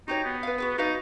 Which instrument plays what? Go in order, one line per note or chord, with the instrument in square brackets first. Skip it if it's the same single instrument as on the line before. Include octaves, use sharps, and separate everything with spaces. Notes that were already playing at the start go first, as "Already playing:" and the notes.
[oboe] D#4 [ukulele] F#4 G4 C#5
[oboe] B3
[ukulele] B4 F5
F#4 G#4 B4
[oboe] D#4 [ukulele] F#4 B4 F5